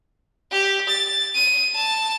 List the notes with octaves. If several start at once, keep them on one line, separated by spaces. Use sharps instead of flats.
G4
A6
D#7
A5